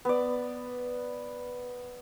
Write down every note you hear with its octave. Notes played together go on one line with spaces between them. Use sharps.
B3 D5